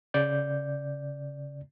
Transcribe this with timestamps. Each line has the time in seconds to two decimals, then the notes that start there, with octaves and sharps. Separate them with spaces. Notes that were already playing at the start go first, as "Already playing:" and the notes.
0.14 C#3 D5 G6